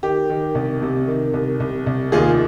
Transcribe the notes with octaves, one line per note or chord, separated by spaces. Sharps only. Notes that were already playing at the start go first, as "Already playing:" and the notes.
D#3 G4
D#3
C2
C3
D#3
C2
C2
C2
D#2 F4 G#4